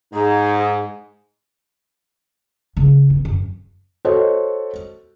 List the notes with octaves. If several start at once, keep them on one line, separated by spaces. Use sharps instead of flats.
G#2 D#4 G#4
C#3
B3
F#2
F#4 A4 C5 C#5 D#5